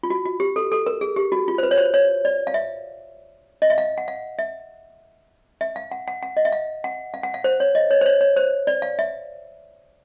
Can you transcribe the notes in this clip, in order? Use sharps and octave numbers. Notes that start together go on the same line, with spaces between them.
F4
F#4
F#4
G4
A4
A4
A#4
G#4
G4
F#4
F4
C5
B4
C#5
C5
C#5
D5
F5
E5
D#5
E5
F5
F#5
F5
E5
E5
F5
F#5
F#5
F#5
D#5
E5
F5
F#5
F5
F#5
F5
C5
C#5
D#5
C#5
C5
C#5
C#5
C5
D5
F5
E5